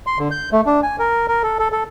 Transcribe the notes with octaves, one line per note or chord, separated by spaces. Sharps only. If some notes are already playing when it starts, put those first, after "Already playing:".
C6
D3
G6
A3
D4
G#5
A#4
A#4
A4
A4
A4